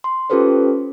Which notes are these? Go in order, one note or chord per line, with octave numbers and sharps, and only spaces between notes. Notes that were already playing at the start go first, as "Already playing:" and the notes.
C6
C#4 F4 G4 A4 B4 C5